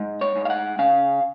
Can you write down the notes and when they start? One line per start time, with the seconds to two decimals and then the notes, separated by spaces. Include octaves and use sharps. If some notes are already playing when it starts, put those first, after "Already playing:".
Already playing: G#2
0.21 C#5
0.36 G#2
0.45 F5
0.50 F#5
0.79 C#3 F5